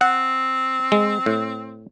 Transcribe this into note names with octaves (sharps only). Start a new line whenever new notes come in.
C4 F#5
G#3
A2